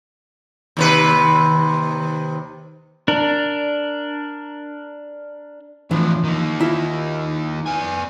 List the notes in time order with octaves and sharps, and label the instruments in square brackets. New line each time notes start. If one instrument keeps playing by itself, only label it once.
[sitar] D#2 C3 B4
[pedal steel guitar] D4 A#4
[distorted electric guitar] A2 D3 [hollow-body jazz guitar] E3 F3
[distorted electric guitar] D#3 A#3
[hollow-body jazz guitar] E4 F4 E5
[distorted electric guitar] B3 G#5